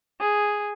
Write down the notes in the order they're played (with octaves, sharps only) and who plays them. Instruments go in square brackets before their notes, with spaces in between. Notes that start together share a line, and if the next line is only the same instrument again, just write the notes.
[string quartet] G#4